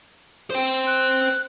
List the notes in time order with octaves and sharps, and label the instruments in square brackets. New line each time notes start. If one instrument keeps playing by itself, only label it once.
[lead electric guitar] C5 G5
[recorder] F#6